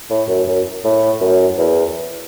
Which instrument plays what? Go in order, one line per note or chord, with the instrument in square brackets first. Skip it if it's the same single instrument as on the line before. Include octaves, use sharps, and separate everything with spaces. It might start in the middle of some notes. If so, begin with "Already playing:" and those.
[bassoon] A2
F#2
F#2
A2
F#2
E2